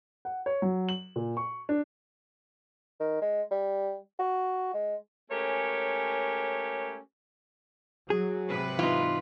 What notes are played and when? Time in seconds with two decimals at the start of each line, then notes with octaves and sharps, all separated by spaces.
0.25 F#5
0.46 C#5
0.62 F#3
0.89 F#7
1.16 A#2
1.37 C#6
1.69 D4
3.00 D#3
3.22 G#3
3.51 G3
4.19 F#4
4.74 G#3
5.31 G#3 A3 C#4 G4 A#4 C#5
8.10 F#3 G#4
8.50 G#2 C3 B4
8.79 E3 D#4 F4